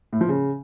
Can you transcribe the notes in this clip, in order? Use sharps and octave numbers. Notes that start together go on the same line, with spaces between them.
A2
F3
C#3